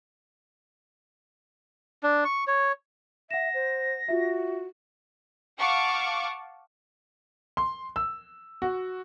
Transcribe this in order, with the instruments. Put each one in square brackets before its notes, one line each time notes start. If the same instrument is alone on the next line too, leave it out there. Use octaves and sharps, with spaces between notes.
[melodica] D4
C#6
C#5
[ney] E5 [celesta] F#5 E7 [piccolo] A#6
[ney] C5
[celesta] F4 E5 [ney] F#4
[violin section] F5 F#5 A5 C#6 D6
[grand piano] C6
E6
F#4